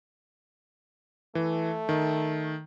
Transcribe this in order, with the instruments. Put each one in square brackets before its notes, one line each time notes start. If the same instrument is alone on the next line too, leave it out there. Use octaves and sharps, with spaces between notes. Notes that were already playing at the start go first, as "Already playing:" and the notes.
[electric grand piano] E3 [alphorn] A3
[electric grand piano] D#3